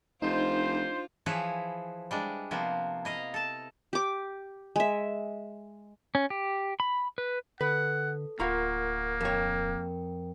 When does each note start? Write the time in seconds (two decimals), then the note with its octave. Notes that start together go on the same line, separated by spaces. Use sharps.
0.22 F1 D4 D#4 F4 C5
1.26 E3 F3 E4 G#4 B4 C#5
2.11 G3 G#3 D4
2.51 C3 F3 A#3 B3
3.05 E4 D#5 F5
3.34 A4 A5
3.93 G4 D6
4.76 G#3 E5
6.15 C#4
6.30 G4
6.80 B5
7.18 B4
7.61 D3 A4 B4 F#5
8.40 D1 A#3 F4 A#4 F#5 A#5 B5 C#6
9.21 F2 A#4 C#5 G5